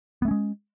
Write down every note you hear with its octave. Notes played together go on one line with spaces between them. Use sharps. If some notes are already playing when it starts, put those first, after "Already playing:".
G#3 A3 B3 C#4